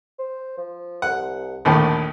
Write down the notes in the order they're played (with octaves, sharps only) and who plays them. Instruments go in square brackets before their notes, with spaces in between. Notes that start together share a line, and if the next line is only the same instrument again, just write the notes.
[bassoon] C5
F3
[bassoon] C2 [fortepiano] F#5
[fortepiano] A#1 D#2 A2 [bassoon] D#3